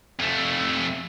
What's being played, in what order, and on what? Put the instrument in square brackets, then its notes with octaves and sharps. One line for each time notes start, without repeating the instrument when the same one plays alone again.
[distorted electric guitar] F2 A3